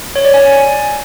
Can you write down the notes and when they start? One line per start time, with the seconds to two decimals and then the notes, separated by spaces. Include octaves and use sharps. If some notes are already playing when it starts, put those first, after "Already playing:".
0.16 C#5
0.25 D5
0.34 G#5